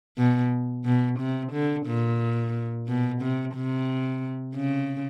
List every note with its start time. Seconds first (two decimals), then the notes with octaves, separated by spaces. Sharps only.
0.18 B2
0.85 B2
1.19 C3
1.53 D3
1.86 A#2
2.88 B2
3.21 C3
3.55 C3
4.55 C#3